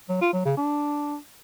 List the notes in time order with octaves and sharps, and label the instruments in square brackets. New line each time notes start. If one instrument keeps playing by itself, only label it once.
[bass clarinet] F#3
F4
F#3
C#3
D4